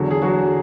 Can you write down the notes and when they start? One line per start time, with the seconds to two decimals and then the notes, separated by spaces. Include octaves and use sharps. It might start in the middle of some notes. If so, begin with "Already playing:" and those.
Already playing: E2 D3 F#3
0.11 G#4
0.22 F#3 F#4